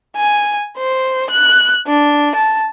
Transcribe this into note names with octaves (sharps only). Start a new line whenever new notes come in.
G#5
C5
F#6
D4
A5